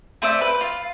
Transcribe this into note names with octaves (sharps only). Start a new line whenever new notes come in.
A3 C5 D5 E5
B4
F4